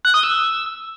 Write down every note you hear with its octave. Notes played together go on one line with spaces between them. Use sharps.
F#6
D#6
E6